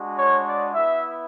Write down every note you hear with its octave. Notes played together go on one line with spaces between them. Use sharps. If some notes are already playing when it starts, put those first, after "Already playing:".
Already playing: G#3 D4 F#4
C#5
D5
B3 E4 E5